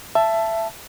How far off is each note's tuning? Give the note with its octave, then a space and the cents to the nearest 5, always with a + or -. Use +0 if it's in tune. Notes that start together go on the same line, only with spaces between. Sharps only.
E5 +20 A5 +0